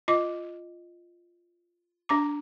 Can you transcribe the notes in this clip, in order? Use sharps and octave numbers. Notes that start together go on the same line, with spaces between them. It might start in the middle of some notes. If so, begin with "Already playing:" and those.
F4 D#5 D6
D4 A#5 D6